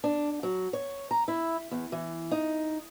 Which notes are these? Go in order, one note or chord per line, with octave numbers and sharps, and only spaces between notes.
D4
F#3
C#5
A#5
E4
E2
E3
D#4